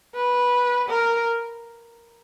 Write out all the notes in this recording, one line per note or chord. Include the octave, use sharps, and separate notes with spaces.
B4
A#4